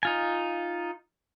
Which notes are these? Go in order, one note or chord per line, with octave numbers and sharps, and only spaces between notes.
D#4 F4 G#5